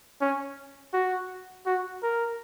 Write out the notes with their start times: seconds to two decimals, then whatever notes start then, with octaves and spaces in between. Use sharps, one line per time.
0.21 C#4
0.93 F#4
1.66 F#4
2.03 A#4